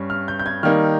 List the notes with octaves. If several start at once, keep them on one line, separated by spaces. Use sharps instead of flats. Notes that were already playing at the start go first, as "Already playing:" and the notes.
Already playing: G2 G3 C#4
F6
G6
G6
G#6
D#3 G3 A#3 D#4 F6